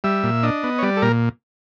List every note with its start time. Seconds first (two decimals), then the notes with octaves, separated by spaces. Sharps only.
0.04 G3 E5
0.24 A#2
0.43 D4 D#5
0.63 B3
0.79 C#5
0.83 G3 D5
0.97 A4
1.02 A#2 A#4